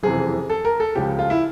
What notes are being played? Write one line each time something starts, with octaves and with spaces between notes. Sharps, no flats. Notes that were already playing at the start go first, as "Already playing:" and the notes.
F#1 F2 C3 E3 G#4
A4
A#4
A4
C#2 C#3 F3 G4
F4
E4